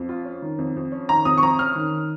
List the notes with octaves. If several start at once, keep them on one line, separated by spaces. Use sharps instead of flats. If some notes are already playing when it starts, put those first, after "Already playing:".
Already playing: F2
F4
C#4
D#3
F2
F2
C#4
D#3 A#5
F2 D#6
C#6
F2 A#5
C#4 F6
D#3